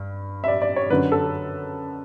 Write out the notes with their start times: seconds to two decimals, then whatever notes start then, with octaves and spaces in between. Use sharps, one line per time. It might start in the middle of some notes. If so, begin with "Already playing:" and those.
Already playing: G2
0.44 E5
0.48 D5
0.62 D5
0.76 C#5
0.90 F#2 D3 F#3 B4
1.12 A4